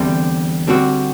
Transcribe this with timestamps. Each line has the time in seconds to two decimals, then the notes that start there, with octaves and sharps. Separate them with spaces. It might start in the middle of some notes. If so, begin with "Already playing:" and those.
Already playing: E2 D3 G3 C4
0.67 D3 G3 C4 F#4